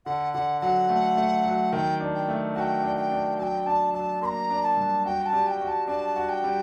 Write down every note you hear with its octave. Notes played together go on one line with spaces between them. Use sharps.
D3 F#5
D3 F#5
F#3 F#5
A3
A3
F#3
D#3 G5
D4
G5
A3
F#4 G5 A5
D4
G5
D4
F#3 G5 A5
D4 A5
F#3 A5
A#3 A#5 C6
D4
A5
G2
F#4 G5
A5
G3
G5
F#4
A5
D4 A5
F#4
G5
G3